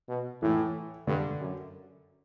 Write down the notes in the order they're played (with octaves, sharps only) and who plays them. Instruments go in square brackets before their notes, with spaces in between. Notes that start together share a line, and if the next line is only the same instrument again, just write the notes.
[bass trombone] B2
[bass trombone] A2 [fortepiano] E3
[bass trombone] G2 [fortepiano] D3
[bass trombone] F#2